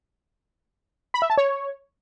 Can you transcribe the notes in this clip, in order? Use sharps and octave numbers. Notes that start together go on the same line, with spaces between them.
B5
E5
A5
C#5